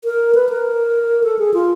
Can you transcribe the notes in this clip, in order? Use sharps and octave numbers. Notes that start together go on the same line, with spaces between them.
A#4
B4
A#4
A4
G#4
F4